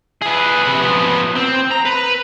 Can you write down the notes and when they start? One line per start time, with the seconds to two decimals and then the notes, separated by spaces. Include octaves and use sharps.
0.22 G#4 B4
0.63 C3 B4
0.80 F3 B3
1.36 C4
1.71 A#5
1.85 B4